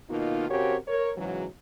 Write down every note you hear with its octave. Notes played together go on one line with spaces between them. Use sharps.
B2 D#3 A#3 D#4 F4
C#3 C4 F#4 G4 A#4 C#5
A#4 C#5
G#2 C#3 E3 F#3